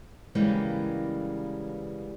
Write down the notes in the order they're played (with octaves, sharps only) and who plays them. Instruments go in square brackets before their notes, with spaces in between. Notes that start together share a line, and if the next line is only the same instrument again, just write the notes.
[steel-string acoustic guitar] C#3 E3 G3 G#3 A#3 B3